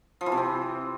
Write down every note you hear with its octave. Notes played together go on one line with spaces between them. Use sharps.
F3
E3
C3
C4